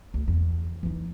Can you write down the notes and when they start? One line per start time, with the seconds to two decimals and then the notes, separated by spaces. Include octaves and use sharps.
0.14 D2
0.28 E2
0.83 E3 D#4